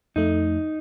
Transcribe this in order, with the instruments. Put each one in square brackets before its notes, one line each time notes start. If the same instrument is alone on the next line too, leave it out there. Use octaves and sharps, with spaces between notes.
[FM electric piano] F2 A3 [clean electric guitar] D#4